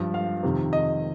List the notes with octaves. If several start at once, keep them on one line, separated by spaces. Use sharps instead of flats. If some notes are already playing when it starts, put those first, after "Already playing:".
Already playing: G2 F3
F5
F2 C3 D#3
D#5